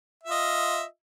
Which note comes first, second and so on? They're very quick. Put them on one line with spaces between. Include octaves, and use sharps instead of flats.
E5 F4 D#5